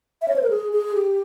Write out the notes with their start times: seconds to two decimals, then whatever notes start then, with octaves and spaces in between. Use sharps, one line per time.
0.22 E5
0.28 C#5
0.36 C5
0.43 A#4
0.50 G#4
0.73 G#4
0.95 G4